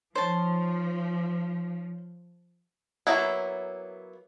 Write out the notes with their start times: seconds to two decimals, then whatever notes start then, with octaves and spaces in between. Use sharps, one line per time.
0.15 F3 D#4 C5 C#5 A5
3.07 F#3 A#3 B3 E4